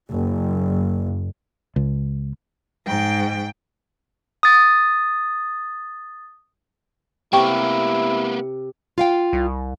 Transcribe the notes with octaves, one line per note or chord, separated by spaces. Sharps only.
F#1
C#2
G#2 G5
D#6 A6
C3 A#3 B3 E4 G4 A#4 G5 C#6
F4 F5 G5
C2